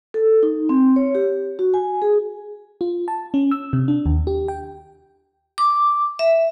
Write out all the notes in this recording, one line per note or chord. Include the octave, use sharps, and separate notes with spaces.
A4
D#4
C4
C#5
G4
F#4
G#5
G#4
F4
A5
C#4
E6
C3
D4
D#2
G4
G5
D6
E5